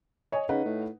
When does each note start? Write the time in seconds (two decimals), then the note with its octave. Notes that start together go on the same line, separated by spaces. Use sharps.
0.32 C#5 D#5 G#5
0.49 C#3 D#4 B4 F#5
0.65 A2